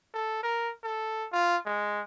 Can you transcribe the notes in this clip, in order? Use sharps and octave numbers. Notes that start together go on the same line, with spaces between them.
A4
A#4
A4
F4
G#3